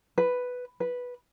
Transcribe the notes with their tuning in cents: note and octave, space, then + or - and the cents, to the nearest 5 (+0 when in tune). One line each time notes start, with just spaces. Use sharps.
B4 +5
B4 -5